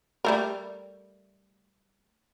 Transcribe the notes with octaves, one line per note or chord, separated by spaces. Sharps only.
G3 A3 A#4